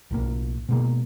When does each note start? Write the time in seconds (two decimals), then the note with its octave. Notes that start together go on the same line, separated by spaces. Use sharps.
0.11 B1 A2 A#3
0.69 B2 G#3 A#3